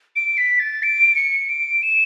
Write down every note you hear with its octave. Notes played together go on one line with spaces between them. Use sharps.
D7
B6
A6
D7
C#7
D7
E7